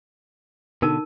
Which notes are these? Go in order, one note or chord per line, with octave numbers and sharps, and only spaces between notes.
B2 D3 D#4 A#4 A5